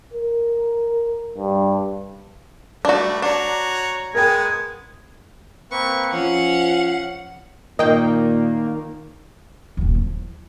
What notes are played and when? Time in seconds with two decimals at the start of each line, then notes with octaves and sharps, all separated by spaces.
0.13 A#4
1.37 G2
2.85 G3 A3 D4 F#4
3.22 D4 F#4 C#5 A#5
4.15 G#3 B3 G#4 A#4 G5 G#6
5.71 A#3 C4 B4 C#6
6.13 F3 C#4 F5 F#5
7.79 A#2 D#3 A#3 D#5 G5
9.77 D#1 D#2
9.94 F3 E4